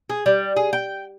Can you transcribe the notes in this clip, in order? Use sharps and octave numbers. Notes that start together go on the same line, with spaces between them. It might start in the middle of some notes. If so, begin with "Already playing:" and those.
G#4
G3
G#4
G5